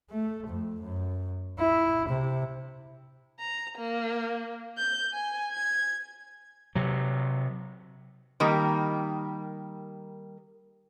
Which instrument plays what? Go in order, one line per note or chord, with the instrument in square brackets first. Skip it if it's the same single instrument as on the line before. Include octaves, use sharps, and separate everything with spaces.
[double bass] A3
F2
F#2
E4
C3
[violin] A#5
A#3
G6
G#5
G#6
[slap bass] C3 F#3
[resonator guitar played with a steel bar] D#3 G3 A#3